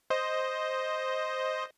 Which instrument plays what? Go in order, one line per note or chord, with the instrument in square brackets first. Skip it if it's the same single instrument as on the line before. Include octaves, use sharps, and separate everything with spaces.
[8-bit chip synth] C5 D#5